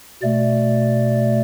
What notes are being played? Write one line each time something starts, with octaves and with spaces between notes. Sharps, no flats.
B2 A3 D5